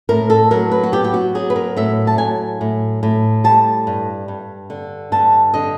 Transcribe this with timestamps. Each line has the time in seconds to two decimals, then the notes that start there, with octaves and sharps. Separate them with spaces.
0.09 A2 A#4
0.30 A4
0.51 F#3 A#4
0.72 B4
0.83 F#4
0.92 B3 G4
1.04 G4
1.14 F#4
1.35 F#3 G#4
1.50 B4
1.56 A#4
1.77 A2 E5
2.07 A5
2.18 F#3 G#5
2.61 A2
3.03 A2
3.44 G3 A5
3.87 G2
4.28 G2
4.70 D3
5.12 G2 A5
5.54 D3 D#5